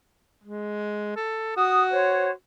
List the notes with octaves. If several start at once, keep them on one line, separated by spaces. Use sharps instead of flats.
G#3
A4
F#4 D#6
C5 C#5